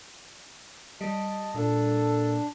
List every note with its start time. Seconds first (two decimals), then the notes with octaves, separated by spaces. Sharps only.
1.01 G3 D#5 A5
1.54 A#2 D4 A4